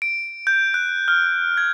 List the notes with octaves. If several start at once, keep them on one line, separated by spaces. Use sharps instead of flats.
D7
G6
F#6
F6
G#6